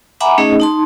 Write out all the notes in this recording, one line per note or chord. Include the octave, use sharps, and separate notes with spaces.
E5 F#5 G#5 A#5 B5 D6
A3 C#4 D#4 G#4 D#5
D#4 A5 C6